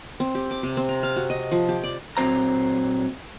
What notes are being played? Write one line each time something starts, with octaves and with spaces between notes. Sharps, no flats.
C4
G4
D6
C3
C4
A#5
F5
F#4
D#5
F3
G4
D5
A#2 F#3 C4 C5 A#5